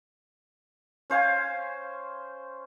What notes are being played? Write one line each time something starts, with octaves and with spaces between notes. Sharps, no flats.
C#4 C5 F5 G#5